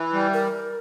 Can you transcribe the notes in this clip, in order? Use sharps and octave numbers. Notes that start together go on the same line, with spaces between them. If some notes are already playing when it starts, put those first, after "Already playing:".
Already playing: E3
G3
A#4